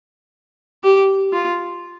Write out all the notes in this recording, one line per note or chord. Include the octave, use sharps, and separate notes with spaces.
G4
F4